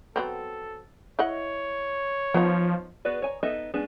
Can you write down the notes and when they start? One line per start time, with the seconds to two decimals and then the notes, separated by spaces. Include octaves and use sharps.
0.16 F#3 B3 C4 A4
1.19 E4 C#5 D#5 F#5
2.34 F3 B3 D#4
3.05 B3 F#4 G#4 B4 D5
3.22 C#5 G#5 A#5
3.43 B3 D#4 A4 D#5 E5
3.74 G#3 B3 C#4 D4 G#4